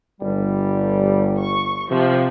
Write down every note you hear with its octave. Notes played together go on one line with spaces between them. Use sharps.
G1 G3
C#6
C3 F3